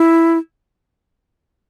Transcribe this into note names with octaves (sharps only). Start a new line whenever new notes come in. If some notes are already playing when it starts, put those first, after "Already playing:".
Already playing: E4